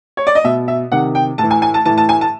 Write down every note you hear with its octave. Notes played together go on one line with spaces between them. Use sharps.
C#5
D5
D#5
B2 E5
E5
C3 D#3 F#5
G5
A2 A5
E3
G#5
G#5
A5
A2 E3 A5
A5
G#5
A5